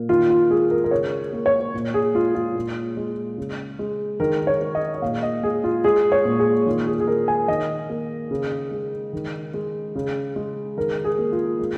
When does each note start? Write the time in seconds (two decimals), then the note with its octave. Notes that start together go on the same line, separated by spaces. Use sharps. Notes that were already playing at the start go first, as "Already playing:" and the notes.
Already playing: A#2 A#3
0.09 D#3 F4
0.30 F4
0.50 G#3 G#4
0.71 A#4
0.84 A#4
0.91 C#3 C#5
1.33 A#3
1.46 C#5
1.74 A#2
1.94 G#4
2.15 G#3 F4
2.35 F4
2.55 A#2
2.97 G#3
3.38 C#3
3.79 G#3
4.20 D#3 A#4
4.47 C#5
4.61 G#3
4.75 D#5
4.95 D#5
5.02 A#2 F5
5.23 D#5
5.43 G#3 G#4
5.64 F4
5.84 G#3 G#4
6.12 C#5
6.25 A#2
6.39 G#4
6.66 D#3 F4
6.87 G#4
7.00 G#4
7.07 G#3 A#4
7.28 G#5
7.48 D#3 D#5
7.90 A#3
8.31 C#3
8.71 G#3
9.13 D#3
9.54 G#3
9.95 C#3
10.36 G#3
10.77 D#3 A#4
11.04 G#4
11.18 A#3
11.32 F4
11.59 G#3